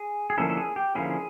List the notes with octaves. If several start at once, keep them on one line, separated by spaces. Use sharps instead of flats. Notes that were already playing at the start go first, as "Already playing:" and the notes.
Already playing: G#4
G#4
D3 F3 A#3 C#4 E4 A4
A4
G#4
G4
D3 F3 A#3 C#4 E4 G#4